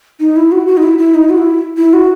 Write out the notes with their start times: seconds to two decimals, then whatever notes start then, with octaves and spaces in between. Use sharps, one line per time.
0.20 D#4
0.36 E4
0.52 F#4
0.67 F#4
0.77 D#4
0.83 E4
0.98 E4
1.14 D#4
1.29 F#4
1.38 E4
1.77 E4
1.93 F#4